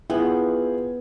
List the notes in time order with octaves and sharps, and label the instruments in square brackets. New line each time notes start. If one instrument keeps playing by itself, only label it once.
[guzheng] B3 [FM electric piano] E4 [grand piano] F4 G#4 G5